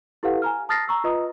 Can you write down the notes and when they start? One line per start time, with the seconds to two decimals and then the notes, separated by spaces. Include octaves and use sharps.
0.23 E4 G4 A4 B4 F5 F#5
0.42 G#5 A#5 F6
0.69 A5 D#6 F6 A6 A#6 C7
0.88 A#5 C#6 E6
1.04 F4 B4 D#5 A#5 D#6